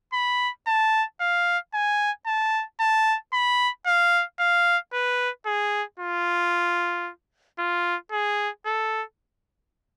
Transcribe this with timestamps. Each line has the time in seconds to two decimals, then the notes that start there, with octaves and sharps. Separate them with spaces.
0.13 B5
0.67 A5
1.20 F5
1.74 G#5
2.27 A5
2.80 A5
3.33 B5
3.86 F5
4.40 F5
4.93 B4
5.46 G#4
5.99 F4
7.59 F4
8.12 G#4
8.66 A4